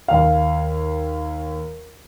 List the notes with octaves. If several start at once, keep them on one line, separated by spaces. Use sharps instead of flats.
D#2 F5